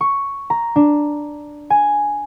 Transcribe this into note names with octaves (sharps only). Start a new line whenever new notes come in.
C#6
A#5
D4
G#5